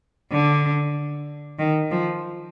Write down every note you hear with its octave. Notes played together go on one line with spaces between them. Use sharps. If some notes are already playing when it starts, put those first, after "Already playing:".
D3
D#3
F3